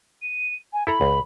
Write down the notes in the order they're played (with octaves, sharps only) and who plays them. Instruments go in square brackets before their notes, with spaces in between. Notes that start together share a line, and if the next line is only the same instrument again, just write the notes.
[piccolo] D#7
G#5
[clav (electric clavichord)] E4 A4 A#5 [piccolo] B5
[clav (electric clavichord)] C#2